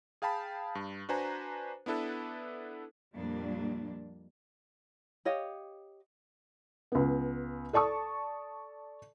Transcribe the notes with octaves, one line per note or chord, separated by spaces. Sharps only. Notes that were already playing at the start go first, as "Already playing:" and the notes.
G#4 F5 G5 A5 B5
G2
D4 F#4 B4 C5 G#5 A#5
B3 D4 E4 A4 B4
F2 A#2 G3 A#3 D4
G4 C#5 D#5 F5
C#2 B3
A4 D5 A5 C#6 D#6